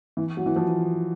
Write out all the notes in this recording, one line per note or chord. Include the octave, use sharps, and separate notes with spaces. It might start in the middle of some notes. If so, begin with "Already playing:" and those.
E3
F#3
E3
F3